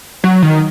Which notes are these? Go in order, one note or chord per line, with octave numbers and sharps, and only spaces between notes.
F#3
D#3